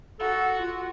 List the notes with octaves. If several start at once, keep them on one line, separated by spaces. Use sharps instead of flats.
F#4 A4
F4